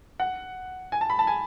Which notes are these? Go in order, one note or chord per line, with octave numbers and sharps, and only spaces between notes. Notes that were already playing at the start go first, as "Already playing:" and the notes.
F#5
G#5
A5
B5
A5
G#5